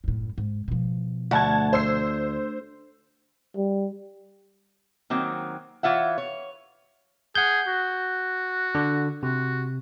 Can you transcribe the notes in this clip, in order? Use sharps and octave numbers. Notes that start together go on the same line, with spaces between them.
F#2 A2
G#2
B2 F3
D2 F#5 A5 G#6
C5 E6 C7
G3
D#3 F#3 A#3 C4
E3 F4 C#5 E5 F#5
C#5
G#4 F#5 G6
F#4
D3
C3 F#4